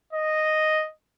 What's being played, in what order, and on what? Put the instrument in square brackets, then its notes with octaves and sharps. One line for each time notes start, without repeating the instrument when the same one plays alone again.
[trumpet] D#5